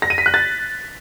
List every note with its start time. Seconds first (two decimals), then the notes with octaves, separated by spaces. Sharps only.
0.02 A#6
0.10 D#7
0.18 B6
0.26 F#6
0.34 A6